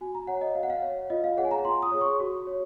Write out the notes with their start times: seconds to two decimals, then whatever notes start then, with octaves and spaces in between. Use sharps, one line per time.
0.01 F#4 G#5
0.15 A#5
0.27 C#5 F#5
0.41 D#5
0.55 F#4 F5
0.63 F#5
0.70 F5
0.82 C#5
1.10 F4 D#5
1.24 F5
1.37 G#4 C#5 F#5
1.45 G#5
1.51 A#5
1.65 F4 C6
1.83 D#6
1.92 G#4 C#5
2.01 C#6
2.20 F#4
2.47 C#5